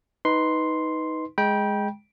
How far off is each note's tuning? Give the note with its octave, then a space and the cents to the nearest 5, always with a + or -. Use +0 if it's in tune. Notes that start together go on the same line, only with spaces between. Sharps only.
D#4 +15 B4 +0 C6 +0
G#3 +0 G5 +0 B5 -35